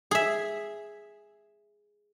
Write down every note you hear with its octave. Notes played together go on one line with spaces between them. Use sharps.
G#4 E5